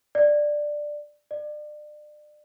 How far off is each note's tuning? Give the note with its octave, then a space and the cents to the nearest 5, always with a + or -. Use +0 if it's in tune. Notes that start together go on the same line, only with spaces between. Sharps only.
D5 +10
D5 +35